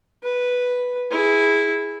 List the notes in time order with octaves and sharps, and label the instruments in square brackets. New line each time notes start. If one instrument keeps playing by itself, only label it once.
[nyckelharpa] B4
E4 G#4